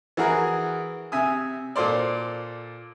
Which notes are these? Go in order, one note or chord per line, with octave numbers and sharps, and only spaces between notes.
E3 F#4 G#4 A#4
C3 E5 G#5 D#6
A#2 A4 C5 D5